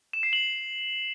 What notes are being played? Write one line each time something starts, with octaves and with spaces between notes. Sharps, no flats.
E7
C7
F#7